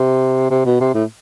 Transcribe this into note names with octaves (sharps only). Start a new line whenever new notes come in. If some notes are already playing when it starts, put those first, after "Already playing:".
Already playing: C3
C3
B2
C3
A2